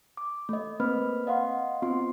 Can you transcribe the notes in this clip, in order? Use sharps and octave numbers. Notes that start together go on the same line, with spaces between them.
D6
A3 D#5
A#3 C4 B4 B5 F6
D#5 F5 F#5 C6
B3 C4 F4 C6